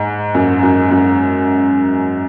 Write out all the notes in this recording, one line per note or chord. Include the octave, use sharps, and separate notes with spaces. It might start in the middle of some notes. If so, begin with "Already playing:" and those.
Already playing: G#2
F#2
F#2
F#2